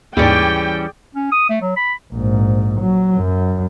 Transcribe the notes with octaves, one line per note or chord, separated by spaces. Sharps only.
D#2 G#2 E3 G3 C#4 G#4 D5 G5
C#4
D#6
A3
F#3
B5
A#1 G#2
F#3
F#2